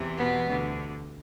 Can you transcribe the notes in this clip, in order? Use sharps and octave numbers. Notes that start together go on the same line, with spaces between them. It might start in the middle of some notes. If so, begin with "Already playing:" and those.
Already playing: E2 C3 E3
B2 B3
D2 D3